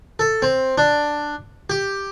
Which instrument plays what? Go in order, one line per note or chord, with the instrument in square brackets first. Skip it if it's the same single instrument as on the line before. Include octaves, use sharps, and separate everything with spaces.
[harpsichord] A4
C4
D4
G4